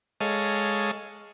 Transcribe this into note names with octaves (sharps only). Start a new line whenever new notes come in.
G#3 A4 C#5 D#5 F5